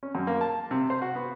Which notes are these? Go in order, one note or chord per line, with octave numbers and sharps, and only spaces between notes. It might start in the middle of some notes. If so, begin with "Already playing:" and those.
C#4
F#2
A#3
A5
C3
C5
F#4
B3